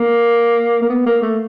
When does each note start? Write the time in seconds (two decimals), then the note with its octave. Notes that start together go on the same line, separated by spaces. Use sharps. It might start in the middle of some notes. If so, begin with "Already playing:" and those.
Already playing: A#3
0.82 A#3
0.89 B3
1.06 A#3
1.22 A3